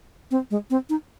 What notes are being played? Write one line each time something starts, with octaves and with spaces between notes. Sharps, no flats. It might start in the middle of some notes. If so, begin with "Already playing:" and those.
C4
G#3
C4
D#4